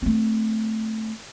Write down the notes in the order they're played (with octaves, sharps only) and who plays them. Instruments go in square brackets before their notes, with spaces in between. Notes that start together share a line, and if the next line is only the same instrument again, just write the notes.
[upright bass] A3 C4